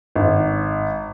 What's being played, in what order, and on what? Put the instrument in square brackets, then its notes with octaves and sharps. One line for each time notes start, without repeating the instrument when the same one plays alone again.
[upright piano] G#1